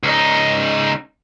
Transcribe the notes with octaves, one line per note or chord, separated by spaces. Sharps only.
C#2 D#4